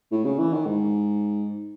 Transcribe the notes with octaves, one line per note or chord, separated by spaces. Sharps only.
A2
C#3
E3
D#3
G#2